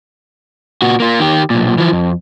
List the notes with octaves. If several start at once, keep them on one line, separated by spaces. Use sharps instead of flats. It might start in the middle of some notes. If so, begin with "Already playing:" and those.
A#2 F#4
A#3 F4
D#3 G4
B1 A#2
E3 F3
F2